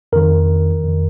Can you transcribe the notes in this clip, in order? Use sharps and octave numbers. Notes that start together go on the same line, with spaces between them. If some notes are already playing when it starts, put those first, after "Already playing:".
F2 D#3 A#4
F2 D#3